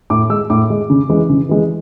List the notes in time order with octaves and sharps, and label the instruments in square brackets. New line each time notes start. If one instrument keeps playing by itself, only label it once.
[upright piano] A2 D6
G#3 E6
A2 D6
G#3
C#3
E3 G#3
C#3
E3 G#3